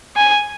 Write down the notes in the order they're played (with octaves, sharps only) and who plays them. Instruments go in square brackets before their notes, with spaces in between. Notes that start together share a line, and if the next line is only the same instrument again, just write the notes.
[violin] G#5